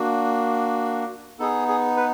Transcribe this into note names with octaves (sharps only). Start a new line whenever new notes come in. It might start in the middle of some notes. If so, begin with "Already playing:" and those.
Already playing: A#3 D4 F#4
B3 D#4 G#4 A4
G#4
B4